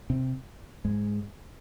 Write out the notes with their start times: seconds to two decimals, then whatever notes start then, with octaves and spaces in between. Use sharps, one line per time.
0.10 C3 C4
0.85 G#2 G#3